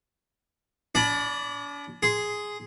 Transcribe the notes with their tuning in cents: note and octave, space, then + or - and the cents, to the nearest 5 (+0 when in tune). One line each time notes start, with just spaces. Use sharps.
D4 -45 D5 +15 B5 -10
G#4 +0 C6 -5